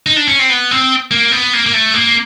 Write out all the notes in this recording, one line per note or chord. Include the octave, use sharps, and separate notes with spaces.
D#4
D4
C#4
C4
B3
C4
A#3
B3
A#3
A#3
A3
A#3